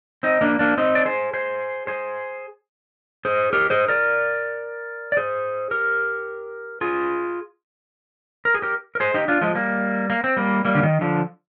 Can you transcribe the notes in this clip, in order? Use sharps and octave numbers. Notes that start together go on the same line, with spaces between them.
C4 D#4
A#3 D4
A#3 D4
C4 D#4
D5
G#4 C5
G#4 C5
G#4 C5
G#4 C5
G4 A#4
G#4 C5
A#4 D5
D5
G#4 C5
G4 A#4
F4 G#4
A#4
G#4
G4 A#4
A#4
G#4 C5
D#4 G4
D4 F4
F3 G#3
G3 A#3
A#3
C4
G3 A#3
G3 A#3
D3
D#3
D3 F3